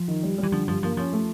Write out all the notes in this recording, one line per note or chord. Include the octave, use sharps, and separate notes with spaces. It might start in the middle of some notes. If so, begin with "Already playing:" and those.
Already playing: F3
D#3
G3
E3 G3
D3 F3
G2 F3
F3 A#3
F3 C#4
A3